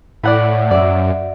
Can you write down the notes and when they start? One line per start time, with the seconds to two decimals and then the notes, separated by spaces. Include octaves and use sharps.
0.23 A2 D5 F#5 B5
0.71 F#2 D5 E5